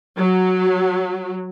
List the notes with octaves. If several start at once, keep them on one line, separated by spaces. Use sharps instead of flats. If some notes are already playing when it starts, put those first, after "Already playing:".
F#3